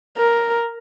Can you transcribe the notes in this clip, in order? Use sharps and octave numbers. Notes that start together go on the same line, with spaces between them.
A#4